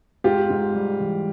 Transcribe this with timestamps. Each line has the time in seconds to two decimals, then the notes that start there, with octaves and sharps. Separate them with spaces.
0.24 G#2 F4 G4
0.50 G#2
0.74 G3
1.00 E3